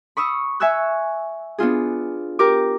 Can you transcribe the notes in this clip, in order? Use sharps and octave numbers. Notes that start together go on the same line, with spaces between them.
B5 C#6 D#6 E6
E5 G#5 C#6 E6 F#6
B3 D4 F4 G#4
G4 A#4 D6